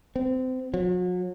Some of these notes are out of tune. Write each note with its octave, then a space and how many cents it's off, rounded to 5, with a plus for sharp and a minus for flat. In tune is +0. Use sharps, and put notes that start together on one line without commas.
C4 -30
F#3 -40